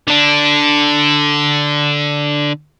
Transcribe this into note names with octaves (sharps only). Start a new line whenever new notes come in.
D3 D4